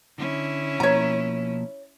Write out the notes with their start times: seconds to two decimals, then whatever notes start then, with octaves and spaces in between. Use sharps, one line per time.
0.18 D3 C#4 E4
0.80 B2 F3 A#3 C#5 A#5